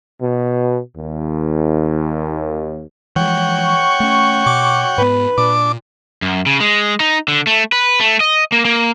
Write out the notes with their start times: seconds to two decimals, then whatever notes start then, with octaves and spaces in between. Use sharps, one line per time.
0.21 B2
0.96 D#2
3.16 E3 F3 G#3 C#5 F#5 G5
3.57 C#6
4.00 A3 C#4
4.46 B2 D6
4.98 G#2 B3 B4
5.38 A#2 D4 D6
6.22 F#2
6.46 C#3
6.60 G#3
7.00 D#4
7.28 D3
7.47 A3
7.72 B4
8.00 A3
8.20 D#5
8.52 A#3
8.65 A#3